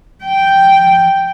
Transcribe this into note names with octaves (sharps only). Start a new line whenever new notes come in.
G5